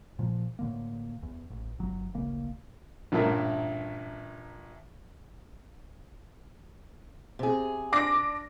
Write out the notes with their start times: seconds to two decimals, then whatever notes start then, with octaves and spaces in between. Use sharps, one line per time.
0.19 A#2 F3
0.59 A2 D3 A#3
1.23 E2
1.50 A1
1.79 G1 F#3
2.14 D1 A1 C#3 A#3
3.12 A1 G2 A#2 A3 E4 A#4
7.39 C3 G#4
7.92 D4 D6 A#6